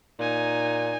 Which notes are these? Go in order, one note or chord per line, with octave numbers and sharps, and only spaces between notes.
A#2 D#4 G#5